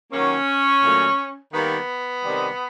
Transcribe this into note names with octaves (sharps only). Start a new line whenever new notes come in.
D#3 F#3 A#3 C#4
A#2 F#3 A3
D#3 G3 A#3 B3
C3 D#3 G3